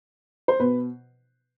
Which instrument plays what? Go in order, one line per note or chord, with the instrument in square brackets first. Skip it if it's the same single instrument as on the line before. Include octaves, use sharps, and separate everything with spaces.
[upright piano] C5
B2 B4